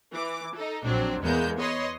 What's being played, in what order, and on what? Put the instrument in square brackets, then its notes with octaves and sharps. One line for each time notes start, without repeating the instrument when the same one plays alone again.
[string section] E3 D6
D#4 A4
A#1 F#3 C4 D4
E2 G#3 A#3 B3 G6
B4 C#5 D#5 C6